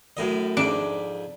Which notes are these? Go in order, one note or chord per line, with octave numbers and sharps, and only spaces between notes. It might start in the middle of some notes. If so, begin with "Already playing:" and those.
F#2 A2 D#5
F2 G#2 D4 B5